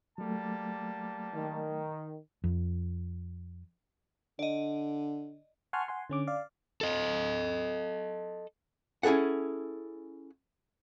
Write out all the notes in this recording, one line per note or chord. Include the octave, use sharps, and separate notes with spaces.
F#3 G3 A3 A#3 A5
D#3
F2
D3 D5 D#5
F#5 G#5 A5 C6 C#6 F6
F#5 G#5 C6
D3 C#4 D6
D5 F5
A4 D#5
C#4 E4 G#4 A4 F#5